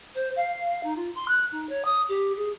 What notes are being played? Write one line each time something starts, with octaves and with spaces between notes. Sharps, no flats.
C5
F5
D#4
F4
C6
F#6
D#4
C#5
D#6
G4
G#4